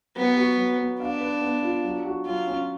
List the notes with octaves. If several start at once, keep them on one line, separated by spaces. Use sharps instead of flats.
F#3 B3
F#4
F#3
B3
D4 F5
B4
B3
F4
F#3
F#4
F#3 F4
C#4